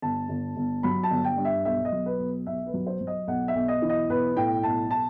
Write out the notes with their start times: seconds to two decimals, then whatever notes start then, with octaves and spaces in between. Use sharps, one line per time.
0.02 G1 A5
0.29 G1
0.57 G1
0.83 F#3 B5
1.03 A5
1.11 G1
1.24 G5
1.37 G2
1.45 E5
1.65 B1 E5
1.85 D#5
1.92 F#3
2.06 B4
2.19 B1
2.47 B1 E5
2.66 B4
2.74 F#3
2.87 C5
3.01 F#3
3.07 D#5
3.27 B1 F#5
3.48 E5
3.55 B1
3.68 D#5
3.82 E3
3.89 D#5
4.09 B1 B4
4.36 A2 G5
4.63 B1 A5
4.91 A5